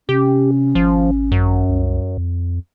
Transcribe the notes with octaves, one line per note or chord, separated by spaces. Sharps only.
C3 C#4 G4
G#1 F3
F#2
C2
F2